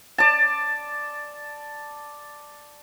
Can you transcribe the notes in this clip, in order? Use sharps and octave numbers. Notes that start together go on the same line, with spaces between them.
D5 A5